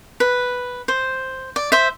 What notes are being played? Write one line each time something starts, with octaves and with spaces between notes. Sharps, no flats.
B4
C5
D5
C5 E5